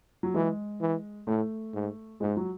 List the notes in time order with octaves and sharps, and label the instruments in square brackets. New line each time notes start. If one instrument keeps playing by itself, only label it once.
[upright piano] F#3
[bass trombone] E3 [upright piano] G#3
[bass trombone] E3
[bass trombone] A2 [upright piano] A3
[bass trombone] G#2
[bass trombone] G#2 [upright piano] G#3
[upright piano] F#3